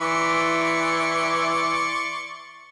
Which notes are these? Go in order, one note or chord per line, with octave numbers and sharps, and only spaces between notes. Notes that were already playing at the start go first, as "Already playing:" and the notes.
E3 D5 C6 C#6